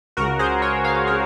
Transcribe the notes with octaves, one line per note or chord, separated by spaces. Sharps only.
C#2 C#3 F#4 A#4
G#4 C5
A#4 C#5
C#5 F5
C#3 A#4 C#5